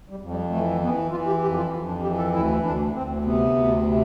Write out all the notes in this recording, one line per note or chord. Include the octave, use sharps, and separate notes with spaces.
G3
F2
G3
E3 A3
E3 B3
E3 F4
G4
F2 G4
F4
F2
D4
E3 G4
A4
D2 E4
D2 D4
D2 C4
C3 B3
D2
C3